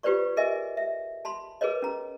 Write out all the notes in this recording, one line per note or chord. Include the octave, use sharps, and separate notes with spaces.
F4 G4 B4 C5 D5 C#6
G#4 A#4 D#5 E5 G#5
E5
A5 B5 C6
G#4 A#4 B4 C#5 D#5
C#4 A#5